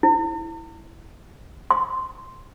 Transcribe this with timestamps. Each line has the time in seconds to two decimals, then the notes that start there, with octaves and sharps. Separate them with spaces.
0.03 E4
1.71 C6